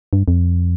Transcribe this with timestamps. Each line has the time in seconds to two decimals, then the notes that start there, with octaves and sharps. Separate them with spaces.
0.13 G2
0.28 F2